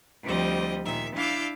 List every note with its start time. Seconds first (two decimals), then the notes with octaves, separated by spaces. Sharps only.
0.24 D2 F3 G3 C4 D#5
0.84 A#2 D#3 E5
1.15 D4 E4 F5 D6 E6 G6